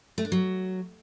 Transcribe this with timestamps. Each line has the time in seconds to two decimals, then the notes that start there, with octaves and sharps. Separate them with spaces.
0.18 A3
0.25 D4
0.32 F#3